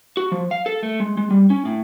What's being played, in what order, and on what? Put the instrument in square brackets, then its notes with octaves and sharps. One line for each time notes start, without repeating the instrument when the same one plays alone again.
[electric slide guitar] F#4
F3
F5
A4
A3
G#3
G#3
G3
C#4
A2